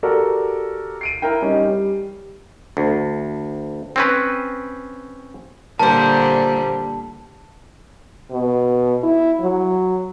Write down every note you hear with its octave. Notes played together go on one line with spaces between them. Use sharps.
F#4 G4 A4 A#4 D5
C7 D7 D#7
E4 A#4 G5
G3 C#4 D#4
G3
D2
C4 C#4 B4
A#2 D3 G3 A#4 C5 A5
B2
E4
F#3